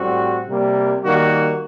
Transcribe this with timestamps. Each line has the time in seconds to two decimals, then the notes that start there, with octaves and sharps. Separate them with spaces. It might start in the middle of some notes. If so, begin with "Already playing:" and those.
Already playing: A2 G3 C4 F#4
0.47 C3 G3 A#3
1.04 D#3 G3 A#3 F#4